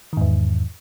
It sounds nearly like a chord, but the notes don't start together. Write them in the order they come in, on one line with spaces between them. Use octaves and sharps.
D#3 G#2 E2